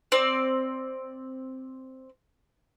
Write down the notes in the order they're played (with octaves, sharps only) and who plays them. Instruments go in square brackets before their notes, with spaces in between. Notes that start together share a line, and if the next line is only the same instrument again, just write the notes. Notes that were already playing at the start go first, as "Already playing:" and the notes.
[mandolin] C4 D5